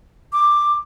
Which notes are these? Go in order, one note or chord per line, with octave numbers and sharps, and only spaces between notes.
D6